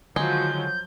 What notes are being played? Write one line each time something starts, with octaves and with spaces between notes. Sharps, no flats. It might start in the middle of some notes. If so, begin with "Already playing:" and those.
D3 D#3 F3 F#3 G#3 G6